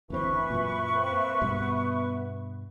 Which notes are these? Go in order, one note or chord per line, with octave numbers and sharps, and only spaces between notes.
F#1 D2 E3 C4 B4 E5 C#6
F#2 A#2
A#3 C4
G2 B2 B3